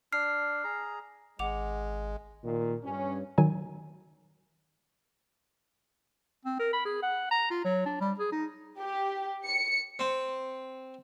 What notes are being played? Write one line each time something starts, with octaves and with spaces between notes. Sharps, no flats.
D4 F6 C7
G#4 A#5
G#1 G#3 F#5 D6 F7
A#2 D#3
G2 C#4
D#3 F#3 G#5
C4
A#4
B5
G#4
F#5
A#5
F4
F#3
D4
G3
G#4
D#4
G4
C#7
C4